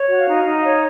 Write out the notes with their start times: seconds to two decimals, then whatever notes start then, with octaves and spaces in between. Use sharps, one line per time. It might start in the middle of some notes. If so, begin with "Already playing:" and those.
Already playing: C#5
0.09 F#4
0.18 F5
0.27 D#4
0.45 D#4
0.64 C#5